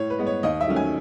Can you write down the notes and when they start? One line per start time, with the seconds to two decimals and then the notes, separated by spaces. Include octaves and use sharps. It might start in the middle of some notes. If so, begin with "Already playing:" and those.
Already playing: A2 C#5
0.10 B4
0.18 G#3 B3
0.27 C#5
0.43 D#2 D#5
0.61 E5
0.68 D#3 F#3 A3 C#4
0.76 G#5